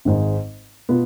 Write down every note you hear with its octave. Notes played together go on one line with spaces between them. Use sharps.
G#1 G#2 G#3
B2 B3 F4